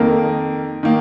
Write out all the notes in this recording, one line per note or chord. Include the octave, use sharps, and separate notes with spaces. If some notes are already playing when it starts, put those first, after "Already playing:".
Already playing: F2 D#3 A#3 A#4
D#3 A#3